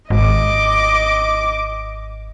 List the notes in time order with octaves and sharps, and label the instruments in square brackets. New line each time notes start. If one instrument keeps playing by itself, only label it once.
[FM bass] G#1 [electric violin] D#5 D6